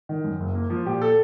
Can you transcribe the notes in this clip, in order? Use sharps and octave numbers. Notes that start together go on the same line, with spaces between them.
D#3
F#2
F#1
A#3
F3
A#2 G4
A4